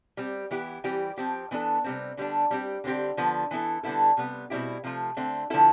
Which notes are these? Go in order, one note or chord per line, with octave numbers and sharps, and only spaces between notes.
G3 C4 G4
E3 B3 E4 G4
E3 G3 C4 G4
F3 C4 G4
E3 B3 D4 A4
C3 G3 C4
D3 G3 B3 D4
G3 C4 G4
D3 G3 C4 G4
D3 F3 B3
E3 B3 E4 A4
D3 G3 B3 E4 A4
C3 G3 B3
B2 G3 C4 E4 G4
C3 F3 A3
D3 A3 C4
D3 F3 B3 E4 A4